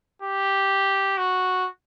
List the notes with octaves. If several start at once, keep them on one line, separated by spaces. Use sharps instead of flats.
G4
F#4